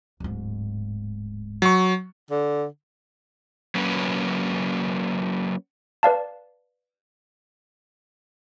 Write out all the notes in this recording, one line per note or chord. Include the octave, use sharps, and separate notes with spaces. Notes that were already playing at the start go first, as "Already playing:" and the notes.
D1 G#2
F#3 C#6
D3
F#3 A#3 C#4 B4
B4 D5 F5 A5